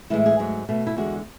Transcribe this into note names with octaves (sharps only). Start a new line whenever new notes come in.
A2 E3 G#3 E4
G#4
G#2 F#3 A3
B2 A3
E4
E2 D3 G#3 F#4